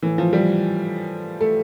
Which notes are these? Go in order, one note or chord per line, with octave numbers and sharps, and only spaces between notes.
A2 E3
F3
G3
A3